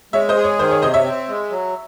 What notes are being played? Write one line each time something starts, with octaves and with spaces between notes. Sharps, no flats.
G#3 C#5 E5
C5 D#5
G#4
C#5
D#3 C5
C#5
C3 C5 D#5
C#5 E5
C4
G#3
F#3